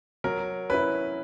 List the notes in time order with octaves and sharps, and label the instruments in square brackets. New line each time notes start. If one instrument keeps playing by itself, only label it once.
[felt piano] F#3 [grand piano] A#4
[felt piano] C#4 E4 [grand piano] B4